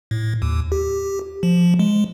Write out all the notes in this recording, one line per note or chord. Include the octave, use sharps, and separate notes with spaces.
A2
D#2
G4
F3
G#3